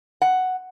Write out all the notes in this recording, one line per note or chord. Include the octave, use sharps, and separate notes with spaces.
F#5